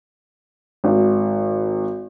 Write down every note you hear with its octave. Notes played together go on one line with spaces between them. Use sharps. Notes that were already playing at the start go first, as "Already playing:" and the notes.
G#1